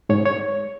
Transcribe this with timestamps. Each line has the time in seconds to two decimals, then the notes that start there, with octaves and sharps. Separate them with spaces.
0.09 G#2 C#5
0.25 C#5